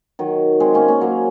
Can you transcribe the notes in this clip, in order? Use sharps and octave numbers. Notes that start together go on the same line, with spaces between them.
D#3 F#3
G#3 C4
A#3 C#4
A#3 C#4
F#3 A#3